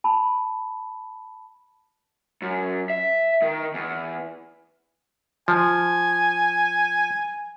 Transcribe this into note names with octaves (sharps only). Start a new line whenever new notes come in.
A5 B5
F#2
E5
D#3
E2
F3 G#5